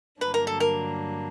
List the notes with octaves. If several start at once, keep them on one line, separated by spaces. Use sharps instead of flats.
G2 D3 F#3 A#3 D4 B4
A#4
A4
A#4